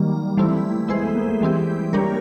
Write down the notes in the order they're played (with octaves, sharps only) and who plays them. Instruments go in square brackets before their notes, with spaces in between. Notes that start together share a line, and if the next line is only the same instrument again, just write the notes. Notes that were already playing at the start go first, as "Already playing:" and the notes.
Already playing: [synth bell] D#3 G3 A#3 [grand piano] F#3
[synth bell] E3 A3 C4 E4 [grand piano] G3
[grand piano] G#3 [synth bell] B3 E4 G#4 C5
[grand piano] A3
A#3
A3
[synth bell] E3 G3 C4 E4 G4 [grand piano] G#3
[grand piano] G3 [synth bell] A#3 D4 G4 A#4 C#5